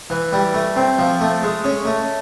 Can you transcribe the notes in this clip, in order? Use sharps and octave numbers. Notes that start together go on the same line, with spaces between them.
E3
G3
A3
C4
F3
A3
G#3
C#4
A3